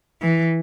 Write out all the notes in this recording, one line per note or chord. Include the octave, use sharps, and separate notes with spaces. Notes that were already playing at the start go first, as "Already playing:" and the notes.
E3